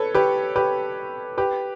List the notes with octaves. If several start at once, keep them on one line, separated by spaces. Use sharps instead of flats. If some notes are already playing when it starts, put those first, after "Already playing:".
Already playing: A4 B4 C#5
G4 B4
G4 B4
G4 B4